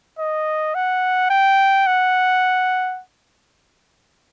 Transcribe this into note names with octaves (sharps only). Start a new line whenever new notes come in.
D#5
F#5
G5
F#5